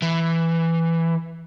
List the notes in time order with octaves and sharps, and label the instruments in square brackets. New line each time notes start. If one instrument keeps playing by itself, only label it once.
[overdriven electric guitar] E3